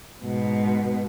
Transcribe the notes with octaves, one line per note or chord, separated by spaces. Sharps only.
G#2 B2